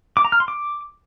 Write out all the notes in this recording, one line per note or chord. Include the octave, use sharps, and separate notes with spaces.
D6
A#5
F6
C6
D6